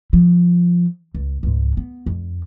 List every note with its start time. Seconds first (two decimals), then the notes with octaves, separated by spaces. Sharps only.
0.13 F3
1.14 C#2
1.43 C#2 G#2
1.77 B3
2.06 F2